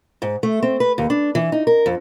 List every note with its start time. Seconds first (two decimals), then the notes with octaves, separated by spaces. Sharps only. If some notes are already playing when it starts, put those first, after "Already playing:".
0.22 G#2
0.43 A3
0.63 C4
0.80 B4
0.98 D#2
1.10 D4
1.35 E3
1.52 D#4
1.67 A#4
1.86 F2